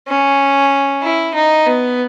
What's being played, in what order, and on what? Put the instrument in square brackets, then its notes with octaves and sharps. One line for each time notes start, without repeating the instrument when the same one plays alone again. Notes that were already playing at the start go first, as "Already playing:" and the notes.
[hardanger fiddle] C#4
E4
D#4
B3